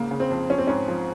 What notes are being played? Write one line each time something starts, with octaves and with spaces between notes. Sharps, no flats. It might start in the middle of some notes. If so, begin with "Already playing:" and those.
Already playing: G#2 C#3 A#3
C#3
C4
F2
F3 C#4
C4
G#2 C#4
F3